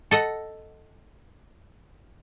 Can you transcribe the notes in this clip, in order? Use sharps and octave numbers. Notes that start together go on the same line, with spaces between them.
A4 D#5 F#5